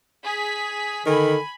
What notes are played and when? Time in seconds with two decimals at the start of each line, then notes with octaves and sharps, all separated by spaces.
0.24 G#4 B6
1.06 D3 D#3 G#5 B5